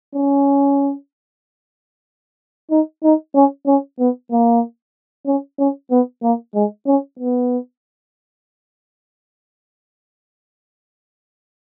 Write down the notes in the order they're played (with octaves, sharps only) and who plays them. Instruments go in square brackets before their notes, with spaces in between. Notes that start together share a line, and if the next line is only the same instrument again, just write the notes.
[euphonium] C#4
D#4
D#4
C#4
C#4
B3
A#3
C#4
C#4
B3
A#3
G#3
C#4
B3